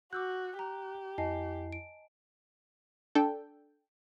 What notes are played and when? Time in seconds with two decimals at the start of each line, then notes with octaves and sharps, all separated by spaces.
0.13 F#4 D6 E6 F#6 G6
0.59 G4 A#5
1.18 F2 E4 D#5 G#5 A5 C7
1.72 D7
3.15 D4 A4 G5